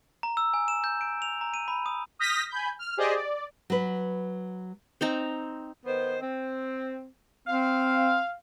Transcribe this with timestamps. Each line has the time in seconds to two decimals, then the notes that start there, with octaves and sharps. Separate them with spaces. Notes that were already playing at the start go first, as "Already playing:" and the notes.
0.23 A#5
0.37 E6
0.54 G#5
0.68 E7
0.84 G6
1.01 D7
1.22 F7
1.41 A#5
1.54 D#7
1.68 B5
1.86 D#6
2.19 D#6 F6 G6 A#6 B6
2.50 G#5 B5 G6
2.79 F6
2.97 G4 G#4 C5 D5 D#5
3.15 D5
3.70 F#3 B4
5.01 C4 D#4 A#5
5.86 D#3 B3 C5
6.21 C4
7.48 C4 F5